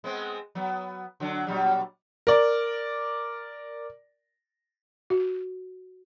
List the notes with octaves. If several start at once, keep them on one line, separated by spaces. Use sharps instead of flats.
G#3 B3 C4
F#3 B3
D3 F#3 D4
A#2 F#3 G3
A#4 D5
F#4